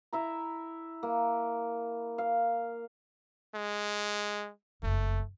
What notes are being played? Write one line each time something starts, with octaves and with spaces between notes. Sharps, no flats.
E4 E5 A#5
A#3
F5
G#3
F#1 F2 A3